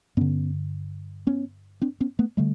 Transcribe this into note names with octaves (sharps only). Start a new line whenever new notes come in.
G2 D3 B3 C#4
B3 C#4
C4 D4
B3 C#4
A3 B3
D3 G3 A3